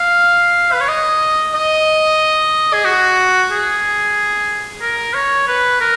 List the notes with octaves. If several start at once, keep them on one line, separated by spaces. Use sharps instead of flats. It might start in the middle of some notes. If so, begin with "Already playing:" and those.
Already playing: F5
B4
C#5
D#5
D#5
G#4
F#4
G#4
A#4
C#5
B4
A#4